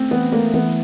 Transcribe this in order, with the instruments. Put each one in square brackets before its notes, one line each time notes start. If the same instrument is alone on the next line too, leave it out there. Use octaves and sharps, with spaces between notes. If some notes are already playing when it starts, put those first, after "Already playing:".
Already playing: [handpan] A3 [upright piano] C4
[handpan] E3 [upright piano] B3
[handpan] A3 [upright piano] A#3
[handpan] E3 [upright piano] B3